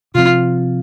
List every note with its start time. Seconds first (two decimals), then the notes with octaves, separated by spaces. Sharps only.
0.15 C3 F3 C4 F4